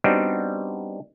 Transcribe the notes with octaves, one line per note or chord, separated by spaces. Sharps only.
G3 B3 C4 D4 D#4 F#4